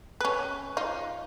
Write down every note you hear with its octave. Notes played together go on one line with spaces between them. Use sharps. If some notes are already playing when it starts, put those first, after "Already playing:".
C#4 B4
D#4 F4